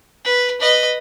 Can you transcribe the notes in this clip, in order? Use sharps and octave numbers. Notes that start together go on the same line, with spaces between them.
B4
B4 D#5